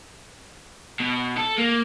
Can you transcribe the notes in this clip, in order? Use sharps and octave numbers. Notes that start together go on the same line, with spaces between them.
B2
A4
A#3